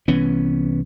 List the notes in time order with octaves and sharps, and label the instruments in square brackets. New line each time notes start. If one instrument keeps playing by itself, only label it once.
[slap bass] C2 E3 B3 C#4